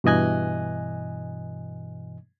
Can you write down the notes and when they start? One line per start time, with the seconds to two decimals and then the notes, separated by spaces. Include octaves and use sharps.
0.04 G2 B2 E3 D#5 G#5 F#6